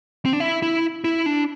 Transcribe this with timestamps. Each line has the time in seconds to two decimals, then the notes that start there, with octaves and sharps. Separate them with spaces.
0.25 C4
0.33 D4
0.40 E4
0.62 E4
1.04 E4
1.26 D4